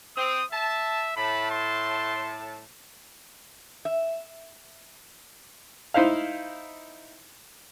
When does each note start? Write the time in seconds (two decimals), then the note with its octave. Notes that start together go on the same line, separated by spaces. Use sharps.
0.17 C4 D#6
0.52 E5 A5
1.17 A2 A5 B5
1.51 C6
3.85 E5
5.94 D#4 E4 C5 F5